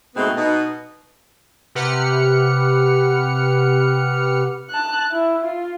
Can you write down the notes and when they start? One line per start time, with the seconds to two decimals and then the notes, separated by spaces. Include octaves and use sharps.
0.16 G#2 B2 G#3 A3 B3 C4
0.37 B2 D#4
1.75 C3 G4 B4 F#5 F6 C#7
4.70 A5 F#6
5.12 E4
5.44 F4